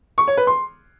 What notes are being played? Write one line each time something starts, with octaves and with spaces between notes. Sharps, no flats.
C#6
C#5
B4
C6